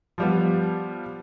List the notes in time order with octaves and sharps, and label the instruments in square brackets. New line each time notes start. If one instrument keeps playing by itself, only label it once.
[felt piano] F3 G3 B3